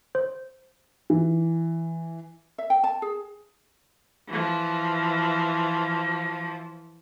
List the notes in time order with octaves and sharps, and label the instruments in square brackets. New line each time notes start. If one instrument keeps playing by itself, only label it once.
[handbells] C5
[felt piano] E3
[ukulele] E5
G5
A5
G#4
[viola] E3 F3